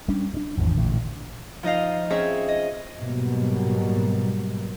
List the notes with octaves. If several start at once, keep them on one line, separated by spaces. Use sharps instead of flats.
G3 C#4 D4
G2 D4
G#1 E2 C3 F3
A1 A#2 D3
F3 D#4 D#5 F5
C4 C#4 G#4 D#5 E5
D#5
G#2 B2 F#3 G3 A#3